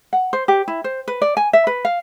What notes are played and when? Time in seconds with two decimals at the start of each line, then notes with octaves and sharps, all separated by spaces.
0.13 F#5
0.33 C5
0.48 G4
0.68 E4
0.84 C5
1.08 B4
1.22 D5
1.37 G#5
1.53 E5
1.67 B4
1.85 F5